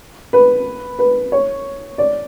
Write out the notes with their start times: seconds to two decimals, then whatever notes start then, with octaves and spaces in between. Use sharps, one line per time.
0.33 B4
0.99 B4
1.32 C#5
1.98 D5